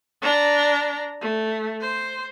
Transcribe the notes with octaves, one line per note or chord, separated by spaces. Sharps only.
D4 A#5
A3
C5